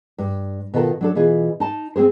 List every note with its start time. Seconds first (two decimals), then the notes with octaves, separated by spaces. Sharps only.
0.18 G2
0.74 B2 D#3 F4 A4 A#4
1.01 F#3 D4 A4
1.15 B2 E3 F4 G#4
1.60 D#4 A5
1.96 C4 C#4 G#4 C5